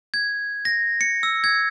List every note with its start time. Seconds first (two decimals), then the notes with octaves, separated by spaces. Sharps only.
0.14 G#6
0.65 A#6
1.01 C#7
1.23 E6
1.44 G#6